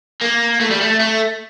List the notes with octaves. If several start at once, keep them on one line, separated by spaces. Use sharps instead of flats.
A#3
A3
G3
A3
A3